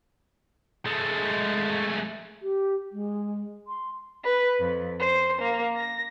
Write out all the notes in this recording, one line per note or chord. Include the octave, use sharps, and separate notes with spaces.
G#3 A3
G4
G#3
C6
B4
F2
C5
A#3
A#6